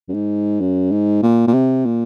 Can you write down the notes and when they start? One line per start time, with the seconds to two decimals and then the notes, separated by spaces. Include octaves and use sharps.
0.09 F#2
0.14 G#2
0.61 F#2
0.92 G#2
1.23 A#2
1.47 A#2
1.54 C3
1.85 A#2